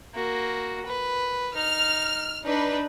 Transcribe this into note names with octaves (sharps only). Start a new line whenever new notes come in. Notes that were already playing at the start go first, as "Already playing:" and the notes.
A#3 F#4
B4
D#4 F6
D4 D#4 B4